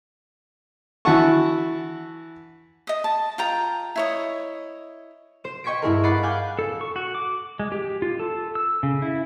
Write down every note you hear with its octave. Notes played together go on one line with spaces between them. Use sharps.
E3 E4 F#4 F#5 A5 C#6
D#5 D#6
A5
F4 G5 A#5
E4 C#5 D#5
C5 E7
D#5 G5 C#6 G#6 B6 D7
G2 E4 G#4 A#4
D#5 F#5 B5 D6 A6 C7
F5 G#5 D6 F#6 G6
A4
C#6
F#4
D6
G#3
G4
F4
A4
E6
C#3
E4